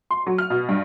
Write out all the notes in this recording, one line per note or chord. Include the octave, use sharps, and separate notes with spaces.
C6
F#3
F6
B2
G2